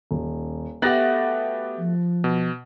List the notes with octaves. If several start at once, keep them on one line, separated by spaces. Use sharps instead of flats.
D#1
A3 B3 F#4 G4 F#6 A6 A#6
F3
B2